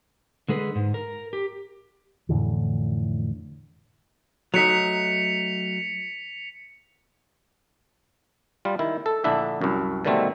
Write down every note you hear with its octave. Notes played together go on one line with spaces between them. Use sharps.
D3 G#3 G#4 B4
G#2
A#4
G4
F2 A2 D3 E3
F#3 A3 D#4 B6 C#7 F7
G3 F4
D#3 E4
A4
A#1 D3 D4 E4 E5
C2 F#2
B2 D3 D#3 G3 A3 C4